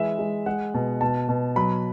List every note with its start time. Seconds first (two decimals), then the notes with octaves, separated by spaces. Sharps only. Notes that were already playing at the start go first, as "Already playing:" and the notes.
Already playing: E3 G#3 E5
0.19 G#3
0.46 G#3 F#5
0.74 B2
1.01 B2 A5
1.29 B2
1.56 F#3 B5